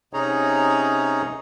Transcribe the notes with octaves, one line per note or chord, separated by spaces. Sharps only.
C3 C#4 D#4 G#4 C#5 A#5